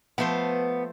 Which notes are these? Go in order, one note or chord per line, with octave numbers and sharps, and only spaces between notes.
F3 A3 B3 C5